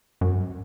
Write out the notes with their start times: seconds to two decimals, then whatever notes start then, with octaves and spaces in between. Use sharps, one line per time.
0.21 F#2
0.33 G2